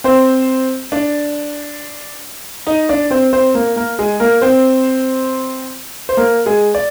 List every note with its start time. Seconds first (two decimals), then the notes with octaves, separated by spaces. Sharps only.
0.04 C4 C5
0.92 D4 D5
2.67 D#4 D#5
2.89 D4 D5
3.11 C4 C5
3.33 C4 C5
3.54 A#3 A#4
3.76 A#3 A#4
3.99 G#3 G#4
4.20 A#3 A#4
4.42 C4 C5
6.09 C5
6.17 A#3 A#4
6.46 G#3 G#4
6.75 D5